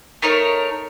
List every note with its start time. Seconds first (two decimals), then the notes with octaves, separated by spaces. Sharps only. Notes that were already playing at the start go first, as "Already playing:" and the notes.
0.22 A3 D#4 A#4 C#5